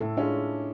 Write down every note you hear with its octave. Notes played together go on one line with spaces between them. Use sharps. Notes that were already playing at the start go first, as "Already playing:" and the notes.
A2 A4
G#3 C#4 D4 F4